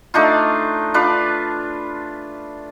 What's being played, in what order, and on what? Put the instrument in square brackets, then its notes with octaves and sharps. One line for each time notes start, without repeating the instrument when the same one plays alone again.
[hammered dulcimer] A3 D4 D#4 F4
D4 F4 B4